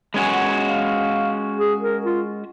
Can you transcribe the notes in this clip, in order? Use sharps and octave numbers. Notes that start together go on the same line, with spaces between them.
G#3 C#4 F#4 G#5
F#5
F5
G#4
A#4
F4